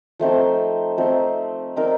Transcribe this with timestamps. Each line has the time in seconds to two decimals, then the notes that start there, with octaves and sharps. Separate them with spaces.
0.19 F3 A3 C4 D#4
0.98 F3 A3 C4 D#4
1.76 C4 D#4 A#4 D5